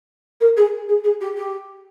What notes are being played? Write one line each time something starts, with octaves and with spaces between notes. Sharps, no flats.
A#4
G#4
G#4
G#4
G4
G4